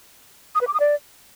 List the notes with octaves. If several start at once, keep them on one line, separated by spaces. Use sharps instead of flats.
D#6
B4
D6
D#6
D5